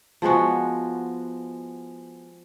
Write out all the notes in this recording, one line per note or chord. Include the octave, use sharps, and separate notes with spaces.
F3 G#3 B3 F#4